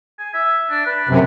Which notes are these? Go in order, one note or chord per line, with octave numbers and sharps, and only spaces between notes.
G#5
E5
D4
B4
F#2 C3